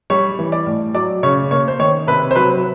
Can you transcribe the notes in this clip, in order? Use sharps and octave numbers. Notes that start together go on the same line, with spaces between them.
G3 C#5
E3
D5
A2
F#3 D5
C#3 C#5
A#3 C#5
C5
D#3 C#5
C3 B4
C5
F#3 B4